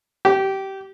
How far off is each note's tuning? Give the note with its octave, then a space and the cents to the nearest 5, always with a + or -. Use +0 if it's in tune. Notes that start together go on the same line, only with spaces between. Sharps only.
G4 -20